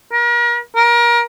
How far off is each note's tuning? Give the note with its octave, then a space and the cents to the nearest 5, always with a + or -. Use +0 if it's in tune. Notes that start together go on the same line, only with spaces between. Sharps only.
A#4 +40
A#4 +25